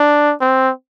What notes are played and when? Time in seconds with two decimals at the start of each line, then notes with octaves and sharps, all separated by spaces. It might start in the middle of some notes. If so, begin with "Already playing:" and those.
Already playing: D4
0.41 C4